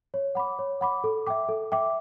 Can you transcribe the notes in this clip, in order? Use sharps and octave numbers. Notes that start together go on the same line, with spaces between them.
C#5
F#5 B5 D6
C#5
F#5 B5 D6
A4
E5 G5 D6
A4
E5 G5 D6